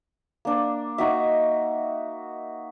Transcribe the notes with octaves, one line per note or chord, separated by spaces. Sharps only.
A#3 D4
D#4 F#4 E5